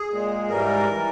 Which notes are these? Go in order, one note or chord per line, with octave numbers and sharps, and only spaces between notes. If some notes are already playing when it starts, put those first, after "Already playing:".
Already playing: G#4
A#2 G#3
G#2 E3 G3 A#4
E3 G3